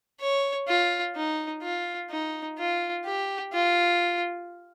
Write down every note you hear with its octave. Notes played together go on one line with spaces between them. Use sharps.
C#5
F4
D#4
F4
D#4
F4
G4
F4